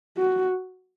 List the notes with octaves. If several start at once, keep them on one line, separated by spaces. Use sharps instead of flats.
F#4